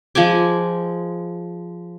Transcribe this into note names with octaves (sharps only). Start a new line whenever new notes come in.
F3 G#3 G#5 D6